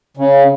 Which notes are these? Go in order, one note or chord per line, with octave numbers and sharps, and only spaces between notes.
C#3